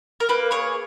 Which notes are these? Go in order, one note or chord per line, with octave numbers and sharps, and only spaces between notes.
A#4
A#3 B4
G#4 C#5